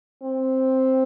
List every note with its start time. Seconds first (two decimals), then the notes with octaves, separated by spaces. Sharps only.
0.23 C4